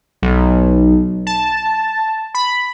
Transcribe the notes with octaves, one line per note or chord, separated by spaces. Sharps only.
B1
A5
B5